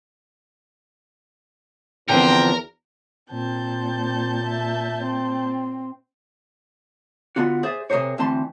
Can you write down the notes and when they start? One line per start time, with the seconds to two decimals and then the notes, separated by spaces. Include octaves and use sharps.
2.09 E2 D3 F3 C4 A#4 G5
3.31 A#2 C4 A5 G6
4.44 E5
5.03 C4
7.36 D3 B3 F4 F#4
7.63 G#4 C5 D5 E5
7.90 C3 G#4 A#4 C5 C#5
8.18 D2 E3 C4 A5 C6